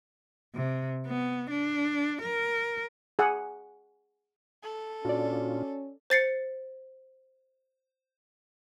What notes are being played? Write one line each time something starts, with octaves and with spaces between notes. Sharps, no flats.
C3
B3
D4
A#4
G#4 F#5
A4
A#2 C#4 D4 F4 F#4 D5
C5 A6 C7 C#7